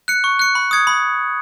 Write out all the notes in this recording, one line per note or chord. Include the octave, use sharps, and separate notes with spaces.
F#6 C#7
C#6
F#6 C#7
B5
D#6 G#6 C#7
B5